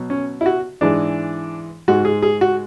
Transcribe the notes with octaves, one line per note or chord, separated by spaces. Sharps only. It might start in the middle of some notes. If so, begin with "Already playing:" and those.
Already playing: B2 F#3
C#4
E4
F#4
G#2 E3 G#3 D4
G#2 G#3 F#4
G#4
G#4
F#4